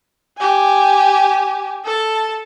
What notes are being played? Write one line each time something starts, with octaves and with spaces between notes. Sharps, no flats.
G4 G#5
A4 A5